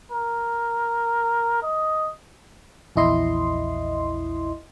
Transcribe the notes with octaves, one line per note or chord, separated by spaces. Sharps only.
A#4
D#5
A#1 E2 E4 D#5 C6